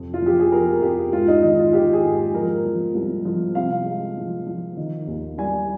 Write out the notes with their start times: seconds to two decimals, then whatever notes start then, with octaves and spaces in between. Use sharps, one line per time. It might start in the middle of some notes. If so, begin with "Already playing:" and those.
Already playing: F2 C3
0.14 F4
0.21 F3 G4
0.39 G#4
0.52 F3 A#4
0.82 F2 G4
1.13 G#2 F4
1.28 D#4
1.43 D#3 D#4
1.59 F4
1.73 D#3 G4
1.93 G#4
2.04 G#2
2.14 G#4
2.34 F3 A#4
2.65 F3
2.95 C2
3.25 F3
3.55 C3 F5
3.86 G#3
4.17 F3
4.46 F3
4.77 D#3
5.07 D#2
5.38 G3 G#5